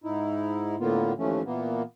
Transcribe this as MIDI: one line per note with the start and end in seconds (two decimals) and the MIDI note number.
0.04 0.76 44
0.04 0.76 63
0.04 0.76 64
0.80 1.13 45
0.80 1.13 50
0.80 1.13 58
0.80 1.13 59
0.80 1.13 65
1.18 1.42 39
1.18 1.42 52
1.18 1.42 53
1.18 1.42 57
1.18 1.42 61
1.45 1.82 46
1.45 1.82 52
1.45 1.82 58
1.45 1.82 59